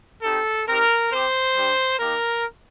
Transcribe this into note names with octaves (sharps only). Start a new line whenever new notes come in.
C4 D#4 G4 A4
C4 D#4 G4 A#4
C4 G4 C5
G3 D4 G4
A#3 D#4 G4 A#4